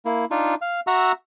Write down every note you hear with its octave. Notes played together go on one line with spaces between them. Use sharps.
A#3 E4
D4 D#4 F4
F5
F#4 E5 F#5 A#5 E6